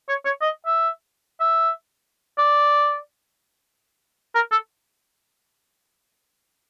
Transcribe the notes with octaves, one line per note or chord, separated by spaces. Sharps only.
C#5
C#5
D#5
E5
E5
D5
A#4
A4